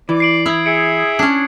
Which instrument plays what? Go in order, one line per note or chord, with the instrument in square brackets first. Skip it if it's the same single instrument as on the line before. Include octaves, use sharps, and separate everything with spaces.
[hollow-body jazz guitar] E3 [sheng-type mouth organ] D5 D6
[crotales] C7 D7 F#7
[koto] E4 [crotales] D#6 G#6
[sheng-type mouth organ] G#4 E5 [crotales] C#7 D7
[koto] C#4 D4